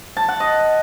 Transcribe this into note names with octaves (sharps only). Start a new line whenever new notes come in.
A5
F#5
D#5